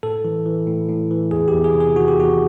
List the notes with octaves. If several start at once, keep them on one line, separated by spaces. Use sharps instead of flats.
A2 A4
E3
E3
A2
A2
E3
E2 G#4
G4
E2
G#4
C3
G#4
D#3 F#4
G4
E2 F#4